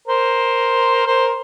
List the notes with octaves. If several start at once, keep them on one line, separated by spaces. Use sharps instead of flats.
A#4 C5
A#4 C5